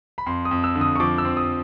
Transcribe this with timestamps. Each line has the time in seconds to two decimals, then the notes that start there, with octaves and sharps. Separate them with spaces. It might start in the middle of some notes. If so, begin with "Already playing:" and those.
0.18 B5
0.26 F2 C6
0.45 D#6
0.51 F2
0.64 E6
0.75 D3
0.81 D#6
0.96 C#6
1.00 F3 D6
1.18 E6
1.25 C4
1.37 D#6